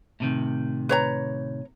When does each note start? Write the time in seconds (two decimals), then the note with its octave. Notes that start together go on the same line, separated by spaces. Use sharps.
0.20 A2 C3 D#3
0.89 B4 C#5 A#5